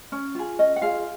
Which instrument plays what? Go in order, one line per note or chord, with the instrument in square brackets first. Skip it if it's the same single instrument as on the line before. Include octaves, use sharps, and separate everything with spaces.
[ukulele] C#4
F4 G#4
C#4 D#5
F#5
F4 G#4 F5